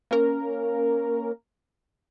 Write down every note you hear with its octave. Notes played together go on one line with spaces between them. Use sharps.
A#3 C#4 A#4